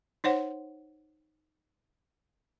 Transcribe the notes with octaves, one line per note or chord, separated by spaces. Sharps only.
D#4 C5 C#5 F#5